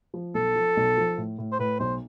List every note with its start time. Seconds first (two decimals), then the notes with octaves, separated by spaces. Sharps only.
0.14 F3
0.34 B1 A4
0.56 F3
0.77 B1
0.98 F3
1.18 A2
1.38 A2
1.52 C5
1.59 A2 B4
1.79 B1 C5